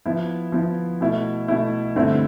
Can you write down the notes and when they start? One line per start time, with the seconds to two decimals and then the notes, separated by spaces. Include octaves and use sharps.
0.06 F3 B3 E4
0.52 F3 B3 E4
1.01 B2 A3 E4
1.48 B2 A3 E4
1.95 G2 D3 A3 C4 E4